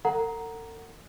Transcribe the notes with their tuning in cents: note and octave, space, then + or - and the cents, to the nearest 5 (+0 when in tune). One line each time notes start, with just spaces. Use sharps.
A4 +45 F#5 +0 A#5 +5